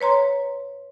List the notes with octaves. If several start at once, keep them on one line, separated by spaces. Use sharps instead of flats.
B4 C#5 A#5 C6